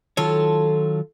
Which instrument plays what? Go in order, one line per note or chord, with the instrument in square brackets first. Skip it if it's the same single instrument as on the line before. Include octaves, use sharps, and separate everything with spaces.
[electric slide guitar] D#3 F#3 C#5 [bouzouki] F4 A4